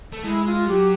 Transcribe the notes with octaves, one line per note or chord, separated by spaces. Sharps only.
A3
G#3 E4
F4
F#3 G4